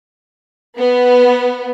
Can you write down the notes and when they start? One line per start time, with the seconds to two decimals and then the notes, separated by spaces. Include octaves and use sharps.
0.78 B3